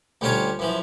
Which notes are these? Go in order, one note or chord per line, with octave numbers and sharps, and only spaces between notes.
D2 G3 C#4 D4 F4 C#5
F#2 E3 F3